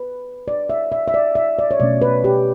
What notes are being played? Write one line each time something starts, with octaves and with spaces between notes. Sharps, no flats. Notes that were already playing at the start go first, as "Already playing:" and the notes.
Already playing: B4
D5
E5
E5
E5
D5
E5
D5
C#5
B2 F#3 A3 C#4 D5
B4
G4